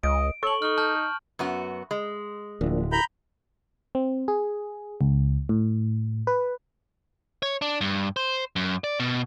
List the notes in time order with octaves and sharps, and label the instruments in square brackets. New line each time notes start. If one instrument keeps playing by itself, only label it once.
[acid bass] C#2 [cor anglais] D#5 [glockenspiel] D7
[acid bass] A4 [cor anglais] C#5 [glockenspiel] C#6 F#7
[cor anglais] D#4 [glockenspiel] C#6 F6
[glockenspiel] A5 F6 G6
[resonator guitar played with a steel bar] F#2 B3 F#4
G#3
[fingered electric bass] D1 [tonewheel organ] F3 A#3 D4
[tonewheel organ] E4 G4 A#4 [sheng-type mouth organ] A#5 B5 G6
[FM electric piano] C4
G#4
C#2
A2
B4
[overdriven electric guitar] C#5
D4
G2
C5
F#2
D5
B2